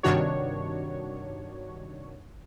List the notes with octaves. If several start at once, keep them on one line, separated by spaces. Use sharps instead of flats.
G2 C3 D#3 D4 F#4 C#5